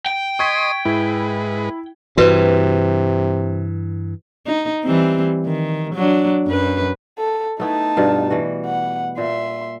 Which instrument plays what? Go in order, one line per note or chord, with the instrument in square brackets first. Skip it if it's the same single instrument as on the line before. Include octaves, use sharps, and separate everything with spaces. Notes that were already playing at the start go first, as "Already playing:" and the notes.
[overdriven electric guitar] G5
[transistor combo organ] D#5 C6 D#6 [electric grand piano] C#6 G#6 B6
[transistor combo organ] G#2 G#3 B4 [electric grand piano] E4
[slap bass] G2 E3 [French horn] C3 [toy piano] F#4 B4
[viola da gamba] D#4
E3 G3 C4
D#3
F#3 D4
F#2 B4
[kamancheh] A4
[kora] A3 B3 E4 [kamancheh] D#4 A5
[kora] G2 B2 F4
E3 G3 F#4
[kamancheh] F#5
[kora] A#2 [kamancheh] E5 C6